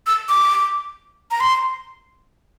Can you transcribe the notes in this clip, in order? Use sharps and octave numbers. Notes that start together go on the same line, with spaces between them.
E6
D6
A#5
C6